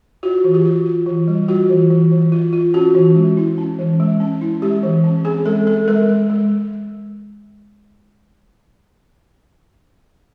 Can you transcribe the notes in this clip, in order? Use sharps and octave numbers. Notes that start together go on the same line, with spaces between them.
F4 F#4
E3
G4
F4
F4
E3
G3
F4 F#4
E3
E3
E3
F4
F4
C#4 F#4
E3
G#3
E4
C#4
E3
G#3
C#4
E4
G#3 G4
E3
C#4
C4 G#4
G#3 A4
G#3 A4
G#3 A#4
G#3
G#3